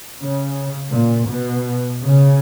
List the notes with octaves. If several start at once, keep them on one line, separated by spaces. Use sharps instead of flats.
C#3
A#2
B2
C#3